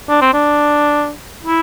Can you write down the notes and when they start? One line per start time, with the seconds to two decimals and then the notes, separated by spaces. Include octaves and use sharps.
0.09 D4
0.21 C4
0.33 D4
1.45 E4